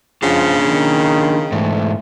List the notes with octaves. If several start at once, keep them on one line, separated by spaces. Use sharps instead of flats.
C#3 F3 D4 F4 F#5
D#3
G#2 E3 A3